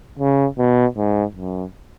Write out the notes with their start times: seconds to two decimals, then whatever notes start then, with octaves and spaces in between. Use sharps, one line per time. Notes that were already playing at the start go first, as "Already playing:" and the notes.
0.19 C#3
0.58 B2
0.97 G#2
1.37 F#2